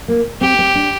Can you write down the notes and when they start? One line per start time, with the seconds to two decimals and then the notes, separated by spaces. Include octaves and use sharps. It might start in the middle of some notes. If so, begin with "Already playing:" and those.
0.08 A#3
0.41 C4 G4
0.59 C4
0.75 D4